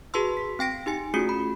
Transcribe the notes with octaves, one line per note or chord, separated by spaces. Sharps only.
F#4 G#4 B4 A5 C6 E6
B6
C4 G5 A#6 D7
D#4 G4 G#5 C#7
A3 C#4 F4 F#4 G#4 C#7
B5